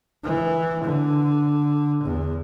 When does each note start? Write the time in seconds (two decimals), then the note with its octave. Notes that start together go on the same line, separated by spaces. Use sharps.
0.24 E3
0.84 D3
2.04 E2